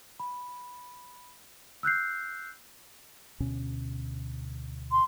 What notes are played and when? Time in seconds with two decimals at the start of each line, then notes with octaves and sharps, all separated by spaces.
0.20 B5
1.83 E6 F#6 G6 C7
3.40 D2 B2 C#4
4.91 C6